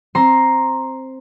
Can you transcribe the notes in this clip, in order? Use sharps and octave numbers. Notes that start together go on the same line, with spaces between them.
C4 A#5 C6